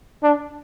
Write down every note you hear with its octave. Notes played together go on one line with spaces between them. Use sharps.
D4